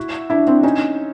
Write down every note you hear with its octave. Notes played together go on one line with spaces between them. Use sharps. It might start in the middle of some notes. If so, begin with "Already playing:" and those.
Already playing: E4 F#4
D4 E4
C4 D4
C#4 D#4